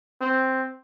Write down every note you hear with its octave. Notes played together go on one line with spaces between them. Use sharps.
C4